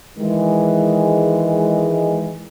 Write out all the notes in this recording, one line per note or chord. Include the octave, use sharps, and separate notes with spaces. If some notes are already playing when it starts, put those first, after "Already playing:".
D#3 E3 G#3